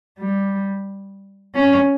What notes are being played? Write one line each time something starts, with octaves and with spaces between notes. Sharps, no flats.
G3
C#4